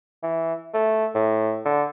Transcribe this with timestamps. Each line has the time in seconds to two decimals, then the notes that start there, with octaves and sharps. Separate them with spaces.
0.23 E3
0.74 A3
1.15 A2
1.65 D3